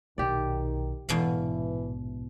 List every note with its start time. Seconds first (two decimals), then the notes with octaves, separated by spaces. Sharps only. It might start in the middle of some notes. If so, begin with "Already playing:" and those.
0.18 B1 A#2 D#3 G4 D5
1.09 A#1 E2 G#2 B2 E3 F5